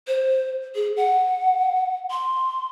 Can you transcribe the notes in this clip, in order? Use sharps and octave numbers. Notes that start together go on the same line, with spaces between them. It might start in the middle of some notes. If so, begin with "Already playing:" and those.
C5
G#4
F#5
C6